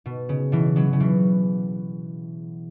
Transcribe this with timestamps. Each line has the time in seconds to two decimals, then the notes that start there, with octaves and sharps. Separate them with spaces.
0.06 B2
0.29 C#3
0.52 B2 E3
0.76 C#3 F#3
0.93 C#3
1.00 B2 E3